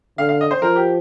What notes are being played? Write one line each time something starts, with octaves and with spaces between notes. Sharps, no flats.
D3 F5
F5
D#5
C5
F3 A#4
G4